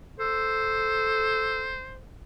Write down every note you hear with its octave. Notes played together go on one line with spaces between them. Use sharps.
A4 C5